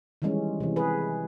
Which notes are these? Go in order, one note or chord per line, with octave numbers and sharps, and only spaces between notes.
D#3 E3 G3 G#3 C#4
C3 E3
G#4 B4